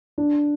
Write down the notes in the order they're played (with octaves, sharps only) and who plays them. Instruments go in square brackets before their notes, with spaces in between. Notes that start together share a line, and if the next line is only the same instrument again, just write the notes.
[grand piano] D4